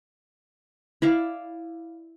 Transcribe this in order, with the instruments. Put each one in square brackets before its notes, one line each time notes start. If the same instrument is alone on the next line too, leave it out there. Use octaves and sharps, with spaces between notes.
[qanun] E4 D5 F5